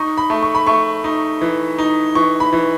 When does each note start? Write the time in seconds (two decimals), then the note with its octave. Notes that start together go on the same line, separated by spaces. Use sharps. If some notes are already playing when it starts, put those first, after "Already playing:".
Already playing: D#4 C#6
0.18 B5
0.30 A3
0.43 C#6
0.55 B5
0.67 A3 C#6
1.04 D#4
1.41 E3
1.78 D#4
2.15 E3 C#6
2.40 B5
2.53 E3